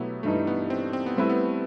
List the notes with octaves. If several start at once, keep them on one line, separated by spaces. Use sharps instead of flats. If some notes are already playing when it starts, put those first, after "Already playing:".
Already playing: B2 F#3 A3 B3 E4 G4
G2 E3 G3 A3 D#4
B3
C4
C4
B3
G3 A3 C4 E4 B4
B3